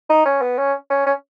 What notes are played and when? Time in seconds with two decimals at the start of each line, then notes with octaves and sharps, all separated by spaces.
0.10 D#4
0.26 C#4
0.42 B3
0.59 C#4
0.90 C#4
1.06 C#4